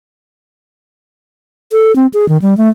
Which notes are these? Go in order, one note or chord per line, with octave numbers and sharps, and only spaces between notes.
A4
C4
G#4
D#3
G3
A3